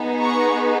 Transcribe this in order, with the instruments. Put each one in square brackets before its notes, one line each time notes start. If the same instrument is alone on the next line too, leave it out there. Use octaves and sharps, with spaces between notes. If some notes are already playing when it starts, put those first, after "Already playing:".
Already playing: [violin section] B3 D#4 G#4
A#5 C#6